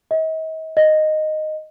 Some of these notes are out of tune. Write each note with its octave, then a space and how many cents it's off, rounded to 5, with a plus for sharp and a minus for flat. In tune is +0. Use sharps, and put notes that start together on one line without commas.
D#5 +40
D#5 -5